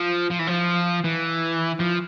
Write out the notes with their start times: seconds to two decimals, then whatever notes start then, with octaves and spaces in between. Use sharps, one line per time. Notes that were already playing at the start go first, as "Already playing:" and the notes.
Already playing: F3
0.30 F3
0.39 E3
0.47 F3
1.04 E3
1.80 F3